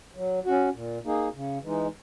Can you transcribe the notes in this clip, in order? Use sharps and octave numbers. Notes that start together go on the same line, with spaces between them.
F#3
C#4 F#4
A#2
A#3 D#4 G#4
C#3
E3 G#3 D#4